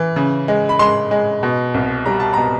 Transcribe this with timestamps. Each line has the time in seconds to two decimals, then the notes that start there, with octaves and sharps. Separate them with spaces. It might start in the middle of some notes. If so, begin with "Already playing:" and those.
Already playing: E3
0.16 C#3
0.48 G#3
0.69 B5
0.79 G#3 C6
1.11 G#3
1.43 B2
1.74 C2
2.06 G3 A#5
2.20 A5
2.33 B2 A#5